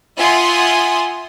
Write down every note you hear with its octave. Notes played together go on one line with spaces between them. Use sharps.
F4 E5 F#5 G#5 C6 D#6